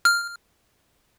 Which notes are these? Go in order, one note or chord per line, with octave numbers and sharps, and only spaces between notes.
F6